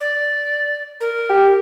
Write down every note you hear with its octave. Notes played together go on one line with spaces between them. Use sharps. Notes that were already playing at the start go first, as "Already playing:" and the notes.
D5
A#4
G4